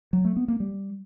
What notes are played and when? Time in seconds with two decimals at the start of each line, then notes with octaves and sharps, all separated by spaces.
0.13 F#3
0.25 A3
0.36 B3
0.48 A#3
0.60 G3